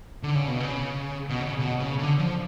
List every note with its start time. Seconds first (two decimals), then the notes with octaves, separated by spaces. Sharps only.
0.23 D3
0.35 C#3
0.47 B2
0.60 C#3
1.29 B2
1.40 C#3
1.59 B2
1.79 C#3
1.98 D3
2.19 F3